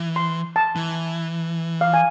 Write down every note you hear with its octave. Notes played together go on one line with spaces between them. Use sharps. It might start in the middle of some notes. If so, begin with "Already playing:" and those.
Already playing: E3
C6
A5
E3
F5
G#5